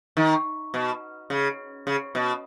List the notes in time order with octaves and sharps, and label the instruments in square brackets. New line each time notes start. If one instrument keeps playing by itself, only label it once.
[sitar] D#3
B2
C#3
C#3
B2